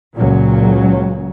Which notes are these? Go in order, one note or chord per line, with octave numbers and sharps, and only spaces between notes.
C#2 A#2 C#3 F#3